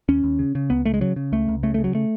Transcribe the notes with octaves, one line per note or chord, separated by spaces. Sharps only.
D#2 C#4
D#2
C#3
C#3
C#2 B3
C#2 A3
G#3
C#3 F#3
C#3
C#2 A3
C#2
C#3 A3
A3
C#3
F#3
A3